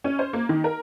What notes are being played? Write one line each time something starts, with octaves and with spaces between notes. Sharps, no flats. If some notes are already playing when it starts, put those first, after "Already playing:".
C#4
C5
A#3
D#3
A#4